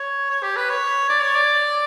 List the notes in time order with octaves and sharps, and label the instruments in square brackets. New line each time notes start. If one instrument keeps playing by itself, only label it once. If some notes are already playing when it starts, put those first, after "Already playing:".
Already playing: [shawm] C#5
C#5
G4
B4
C#5
D5
C#5
D5